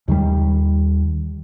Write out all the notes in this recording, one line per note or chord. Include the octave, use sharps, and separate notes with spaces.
D#2 D#3 E3 G3